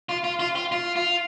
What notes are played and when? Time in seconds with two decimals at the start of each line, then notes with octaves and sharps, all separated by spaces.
0.09 F4
0.24 F4
0.40 F4
0.56 F4
0.72 F4
0.96 F4